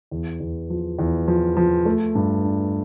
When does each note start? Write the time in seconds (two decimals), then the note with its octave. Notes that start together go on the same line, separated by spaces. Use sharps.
0.11 E2
0.40 E2
0.70 F3
0.99 E2
1.28 F3
1.57 F3
1.85 A3
2.15 G2
2.44 D4